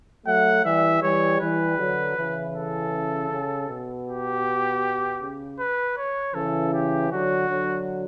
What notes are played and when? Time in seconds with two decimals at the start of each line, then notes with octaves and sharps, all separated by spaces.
0.26 F#3 A3 F#5
0.64 E3 G3 E5
1.03 E3 G3 C#5
1.41 E3 G3 B4
1.78 D3 F#3
2.16 C#3 E3
2.54 A4
3.31 C#3
3.69 B2
4.07 G4
5.21 C#3
5.59 B4
5.97 C#5
6.34 C#3 E3 A4
6.74 G4
7.11 D3 F#3 F#4
7.49 D3 F#3